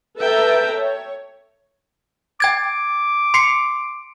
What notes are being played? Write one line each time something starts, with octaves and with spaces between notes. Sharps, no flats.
A4 B4 E5 G5 A5 A#5
C#5
G5 D6 G#6 A6
C6 C7 C#7